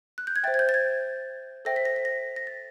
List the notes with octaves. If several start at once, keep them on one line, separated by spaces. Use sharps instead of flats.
F#6
G6
G#6
C5 E5 G5 A6
G#6
G6
A6
G#6
A4 C5 E5 G5 A#6
B6
A#6
B6
A#6
A#6
A6